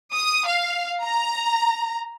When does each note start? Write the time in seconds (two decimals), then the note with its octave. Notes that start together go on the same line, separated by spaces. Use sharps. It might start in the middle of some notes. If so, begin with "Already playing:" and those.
0.13 D#6
0.47 F5
1.04 A#5